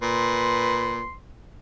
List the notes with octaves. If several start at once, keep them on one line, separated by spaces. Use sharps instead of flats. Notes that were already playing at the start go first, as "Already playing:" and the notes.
A#2 B4 C6